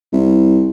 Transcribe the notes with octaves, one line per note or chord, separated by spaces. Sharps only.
C2